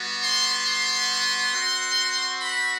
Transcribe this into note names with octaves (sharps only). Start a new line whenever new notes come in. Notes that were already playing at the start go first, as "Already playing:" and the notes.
Already playing: G3 B3 F#4
C6
C6
C4 F#4
B5